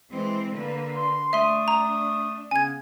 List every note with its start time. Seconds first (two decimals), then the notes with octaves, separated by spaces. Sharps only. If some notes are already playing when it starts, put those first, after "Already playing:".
0.11 E3 G#3 C4
0.54 D3 A#3 B4
0.96 C6
1.33 A3 D4 E5 C6 D#6
1.68 A#5
2.51 C#3 B3 C#4 G#5 G#6